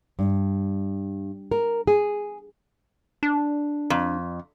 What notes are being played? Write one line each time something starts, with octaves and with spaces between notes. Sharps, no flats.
G2
A#4
G#4
D4
F2